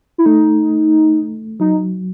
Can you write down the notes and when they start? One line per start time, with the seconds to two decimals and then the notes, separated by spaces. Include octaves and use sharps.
0.18 E4
0.26 A3 D#4
1.60 F#3 D#4